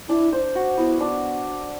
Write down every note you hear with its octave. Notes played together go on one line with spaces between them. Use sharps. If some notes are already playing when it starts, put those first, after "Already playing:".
D4 E4
C5
F#4
B3 E4
D4